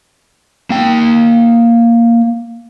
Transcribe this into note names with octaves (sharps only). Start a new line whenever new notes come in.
A#3 G5